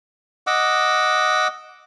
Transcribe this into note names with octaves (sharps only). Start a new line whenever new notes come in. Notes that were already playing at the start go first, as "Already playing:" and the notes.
D#5 F#5 D6 E6